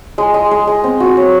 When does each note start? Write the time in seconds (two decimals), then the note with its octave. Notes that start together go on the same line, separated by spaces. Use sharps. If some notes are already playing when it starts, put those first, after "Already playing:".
0.18 G#3
0.34 G#3
0.51 G#3
0.67 G#3
0.84 C4
1.00 F#4
1.17 C#5